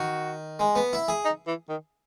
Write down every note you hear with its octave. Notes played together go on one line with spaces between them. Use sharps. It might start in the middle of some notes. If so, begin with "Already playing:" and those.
Already playing: D#3 F#4
G#3
B3
E4
G#4
D#4
E3
D#3